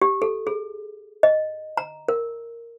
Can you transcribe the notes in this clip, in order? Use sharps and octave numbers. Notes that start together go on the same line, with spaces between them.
G4
A4
G#4
D#5
A#5
A#4